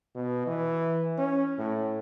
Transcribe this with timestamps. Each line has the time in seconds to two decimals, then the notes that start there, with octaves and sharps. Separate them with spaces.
0.15 B2
0.47 E3
1.18 C#4
1.58 A2